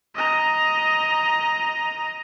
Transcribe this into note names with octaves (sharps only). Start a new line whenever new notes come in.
D#5 A#5